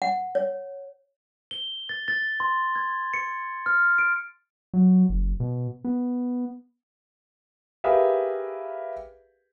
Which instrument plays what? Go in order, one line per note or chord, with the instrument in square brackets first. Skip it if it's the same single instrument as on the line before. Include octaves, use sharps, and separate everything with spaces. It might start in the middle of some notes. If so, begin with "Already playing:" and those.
[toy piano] F#5
C#5
[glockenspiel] G7
A6
A6
C6
G#6
C#7
F6
D7
[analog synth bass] F#3
F#1
B2
B3
[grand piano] G4 G#4 A#4 B4 E5 F5